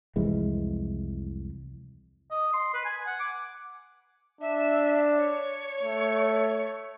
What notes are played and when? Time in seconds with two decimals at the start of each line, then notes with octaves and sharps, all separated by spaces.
0.16 C2 F2 E3 G#3
2.31 D#5
2.54 C6
2.74 B4
2.85 G#5
3.07 F#5
3.20 D6
4.41 D4 E5
5.17 C#5
5.83 A3